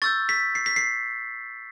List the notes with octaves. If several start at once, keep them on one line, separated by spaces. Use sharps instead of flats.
C#6 E6 G6 A6
B6
C7
B6
C7